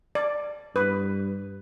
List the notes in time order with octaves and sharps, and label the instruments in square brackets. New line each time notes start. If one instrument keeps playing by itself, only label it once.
[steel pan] D5
[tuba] G2 [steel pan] B4